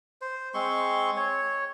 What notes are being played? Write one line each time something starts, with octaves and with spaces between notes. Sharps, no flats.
C5
G#3 C4 C6 C#6
C#5